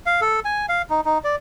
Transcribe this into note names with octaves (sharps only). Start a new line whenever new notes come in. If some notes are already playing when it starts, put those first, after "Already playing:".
F5
A4
G#5
F5
D#4
D#4
D5